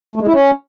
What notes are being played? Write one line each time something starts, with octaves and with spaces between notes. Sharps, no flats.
A3
G#3
E4
C#4